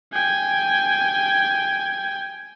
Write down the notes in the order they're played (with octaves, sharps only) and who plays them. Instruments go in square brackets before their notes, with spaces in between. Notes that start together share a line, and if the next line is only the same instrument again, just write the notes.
[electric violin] G5 G#5